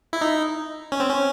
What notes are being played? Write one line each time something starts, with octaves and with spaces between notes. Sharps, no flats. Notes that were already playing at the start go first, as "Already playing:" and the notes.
E4
D#4
C#4
C4
C#4